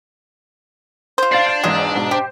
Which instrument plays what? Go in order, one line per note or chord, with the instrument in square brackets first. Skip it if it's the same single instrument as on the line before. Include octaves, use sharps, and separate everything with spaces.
[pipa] F4 C5
[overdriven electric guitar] D4 [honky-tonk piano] F5 A6 C7
[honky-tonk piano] G6
[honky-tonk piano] B1 E2 G#2 [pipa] G#3 F4 G#4
[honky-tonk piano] G#2 B2
[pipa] G4 [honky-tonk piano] C5